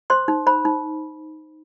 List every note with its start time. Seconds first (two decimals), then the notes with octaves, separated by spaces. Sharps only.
0.10 C5 C6
0.28 D#4
0.47 C5 B5
0.65 D#4